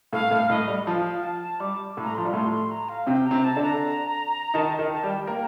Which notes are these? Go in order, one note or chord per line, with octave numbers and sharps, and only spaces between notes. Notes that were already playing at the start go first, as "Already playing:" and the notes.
A2 A3 F5
A2 A3
A2 A3 D#5
G3
F3 F5
A5
G3 D6
A2 A3
A#5
F3 C6
G3
A2 A3 C6
C6
A#5
F5
C3 C4 G5
A#5
C3 C4
A5
D3 D4
A#5
D#3 D#4 A5
D#3 D#4
A5
G3 G4
G5
A#3 A#4 G5